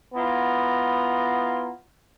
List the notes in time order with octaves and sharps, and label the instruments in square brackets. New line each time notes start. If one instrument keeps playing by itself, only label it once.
[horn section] B3 E4 F4 A#5